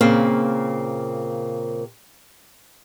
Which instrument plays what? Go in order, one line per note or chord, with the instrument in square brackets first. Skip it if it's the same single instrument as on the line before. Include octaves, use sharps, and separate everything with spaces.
[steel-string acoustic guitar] A#2 C#3 A#3 C4